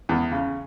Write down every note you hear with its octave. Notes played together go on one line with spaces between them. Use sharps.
E2
C#3